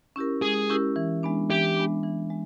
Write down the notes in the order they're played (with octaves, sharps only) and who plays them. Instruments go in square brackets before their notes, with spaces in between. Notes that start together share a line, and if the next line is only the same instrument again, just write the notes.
[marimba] C#4 E4 G4 A#4
[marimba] G#3 [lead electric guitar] G#4
[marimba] C#4 E4 G4 A#4
E3
G#3 B3 D4
[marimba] E3 [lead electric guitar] G4
[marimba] G#3 B3 D4
E3
G#3